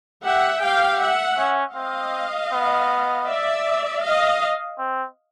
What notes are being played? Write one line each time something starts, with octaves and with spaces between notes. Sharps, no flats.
G4 E5 F#5
G4 F5 G5
E5 F#5
C#4
C4 D#5 F5
B3
D5 E5
D#5 F5
C4